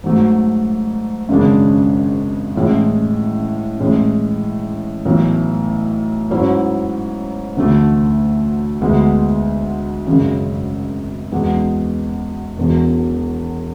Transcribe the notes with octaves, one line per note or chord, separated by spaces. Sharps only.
G#2 F#3 A3
G#1 F#2 C#3 G#3 D4
A1 A2 G#3
A1 A2 G#3
B1 A2 E3 A3
G#2 F#3 C#4 E4
D2 D3 A3
D2 D3 G#3 B3
G#1 F#2 C#3 G#3
E2 B2 G#3 B3
E1 E2 B2